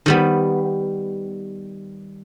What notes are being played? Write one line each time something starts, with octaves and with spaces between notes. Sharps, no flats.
D#3 G3 B3